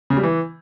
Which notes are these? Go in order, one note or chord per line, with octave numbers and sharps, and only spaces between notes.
C#3
G3
E3